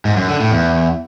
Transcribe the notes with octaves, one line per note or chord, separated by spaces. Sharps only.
G#2
F#2
D3
A2
E2